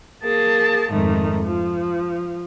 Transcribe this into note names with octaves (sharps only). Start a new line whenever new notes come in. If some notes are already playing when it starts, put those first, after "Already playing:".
A#3 G#4 A5
F2 G#2 D#3 A3
F3